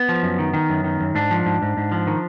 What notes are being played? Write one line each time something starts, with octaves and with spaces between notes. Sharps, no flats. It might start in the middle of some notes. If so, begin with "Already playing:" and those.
Already playing: B3
F3
F#2
D#3
D#3
F#2
D#3
F#2
G#2 D4
F3
G#2
G#2
G#2
F3
D#3